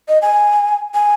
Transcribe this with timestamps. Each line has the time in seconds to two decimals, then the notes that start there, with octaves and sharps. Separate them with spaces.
0.08 D#5
0.22 G#5
0.94 G#5